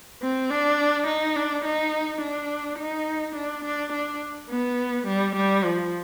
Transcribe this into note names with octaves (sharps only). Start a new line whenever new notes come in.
C4
D4
D#4
D4
D#4
D4
D#4
D4
D4
D4
B3
G3
G3
F3